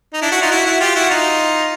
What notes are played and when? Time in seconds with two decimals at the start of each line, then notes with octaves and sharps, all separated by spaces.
0.14 D#4
0.21 D4 E4
0.32 E4 F#4
0.41 D#4 F4
0.51 E4 F#4
0.66 E4 F#4
0.80 F4 G4
0.95 E4 F#4
1.10 D#4 F4